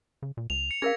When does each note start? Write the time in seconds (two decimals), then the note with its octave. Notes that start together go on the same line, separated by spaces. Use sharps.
0.22 C#3
0.37 A#2
0.50 C#2 F7
0.71 C#7
0.82 C#4 G#4 A#4 F5 G#6 A#6